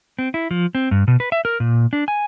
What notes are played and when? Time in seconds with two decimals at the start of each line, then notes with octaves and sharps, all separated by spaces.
0.19 C4
0.34 E4
0.51 F3
0.75 C4
0.91 G2
1.08 B2
1.20 B4
1.32 E5
1.45 A#4
1.60 A#2
1.93 D4
2.08 G#5